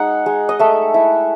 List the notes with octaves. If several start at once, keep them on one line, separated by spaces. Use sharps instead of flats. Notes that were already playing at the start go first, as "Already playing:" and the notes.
Already playing: G#3 D#4 F#5
G#3
D#5
A3 E5
E4